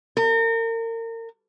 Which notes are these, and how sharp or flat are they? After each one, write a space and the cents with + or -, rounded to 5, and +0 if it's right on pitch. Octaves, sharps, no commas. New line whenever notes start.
A#4 -35